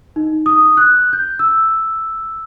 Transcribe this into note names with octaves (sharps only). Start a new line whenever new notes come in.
D#4
D#6
F#6
G6
E6